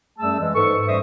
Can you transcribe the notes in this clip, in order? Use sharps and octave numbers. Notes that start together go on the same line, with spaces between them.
F#2 G3 A3 G#4 A5 E6
E3 G#3
G#2 A4 B4 C#6
F#2 G3 C5 D#5 E5 D#6